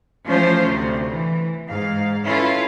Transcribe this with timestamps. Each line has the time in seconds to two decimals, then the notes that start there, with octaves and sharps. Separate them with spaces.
0.27 E3 F3 A3 C#4 F4 C5
0.64 D2 C3
1.08 E3
1.68 G#2 F5
2.25 C#4 E4 F4 A4 B4